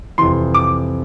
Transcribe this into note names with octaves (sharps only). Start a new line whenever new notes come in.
F2 C3 E3 C6
D6